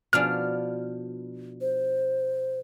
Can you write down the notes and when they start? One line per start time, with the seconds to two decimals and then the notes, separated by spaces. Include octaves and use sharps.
0.13 B2 F3 D4 F6
1.61 C5